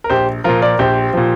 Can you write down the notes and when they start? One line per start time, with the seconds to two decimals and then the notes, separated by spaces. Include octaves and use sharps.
0.04 A#4
0.10 A#1 G4 C5
0.44 A#2 F3 F4 A#4
0.62 A#4 D5
0.79 A#1 G4 C5
1.13 A#2 F3